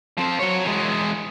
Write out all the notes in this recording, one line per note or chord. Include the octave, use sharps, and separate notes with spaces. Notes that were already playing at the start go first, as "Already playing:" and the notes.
F3 C4
F#3 C#5
E3 G#3